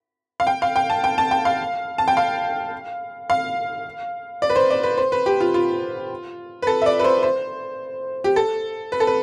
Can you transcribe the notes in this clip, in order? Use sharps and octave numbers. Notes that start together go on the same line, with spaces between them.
F5
G5
F5
G5
A5
G5
A5
G5
F5
A5
G5
F5
F5
D5
B4
C5
D5
B4
C5
B4
G4
F4
F4
B4
A4
E5
D5
B4
C5
C5
G4
A4
B4
A4
B4